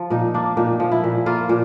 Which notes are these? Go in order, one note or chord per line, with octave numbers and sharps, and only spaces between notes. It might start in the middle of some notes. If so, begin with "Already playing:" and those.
Already playing: F3
A#2 D#4
A#3 D4
A#2 D#4
F3
E4
A#2
A#3 F4
A#2